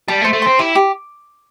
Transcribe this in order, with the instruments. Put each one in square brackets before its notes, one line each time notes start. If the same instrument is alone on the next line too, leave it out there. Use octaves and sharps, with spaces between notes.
[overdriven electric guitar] G3 [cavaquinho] A5
[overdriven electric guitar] A3
[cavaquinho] C5
[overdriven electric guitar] A3
[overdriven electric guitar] C4 [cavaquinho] C6
[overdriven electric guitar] E4 [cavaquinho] G4
[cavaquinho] G4